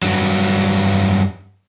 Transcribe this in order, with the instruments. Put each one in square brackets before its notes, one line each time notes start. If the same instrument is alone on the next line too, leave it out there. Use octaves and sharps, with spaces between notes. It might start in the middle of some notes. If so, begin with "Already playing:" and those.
[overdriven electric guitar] G2 F#3